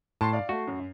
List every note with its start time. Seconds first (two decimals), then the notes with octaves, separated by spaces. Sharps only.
0.21 A2 A5 C6 C7
0.33 D5 F5
0.49 A3 F#4
0.67 F#2